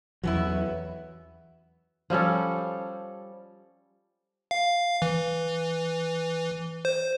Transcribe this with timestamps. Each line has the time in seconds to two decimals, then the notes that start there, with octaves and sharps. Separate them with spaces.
0.24 E2 E3 F#3 B3 C#4 E4
2.10 F3 G3 C#4 A4
4.51 F5
5.02 E3
6.85 C5